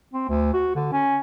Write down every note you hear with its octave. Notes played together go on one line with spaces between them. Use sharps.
C4
D2
F#4
D3
C#4